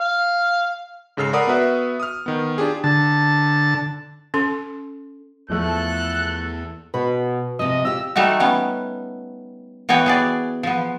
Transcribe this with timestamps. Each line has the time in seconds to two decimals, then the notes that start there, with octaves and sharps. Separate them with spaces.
0.01 F5
1.17 G#2 C#3 A4 F6 C7
1.33 A4 A#4 D5 F#5 B5 D#6
1.47 B3 F#4 B4 E5
2.00 D#6 F6
2.26 D#3 B3
2.58 D4 F4 G4 G#4
2.84 D3 A5
4.34 C#4 A4 C6
5.50 E2 F3 A3 A4 F#6
6.94 B2 B4
7.59 C3 F3 D#5
7.85 F4 G4 E6
8.16 G3 A3 D#4 F#4
8.40 G3 B3 C#4
9.89 E3 B3 F#4 C#5 G5
10.06 B3 G#4 D5
10.63 F3 B3